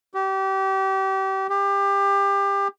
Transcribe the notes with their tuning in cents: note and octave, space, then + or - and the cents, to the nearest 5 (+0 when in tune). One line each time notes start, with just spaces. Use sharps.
G4 -30
G4 +25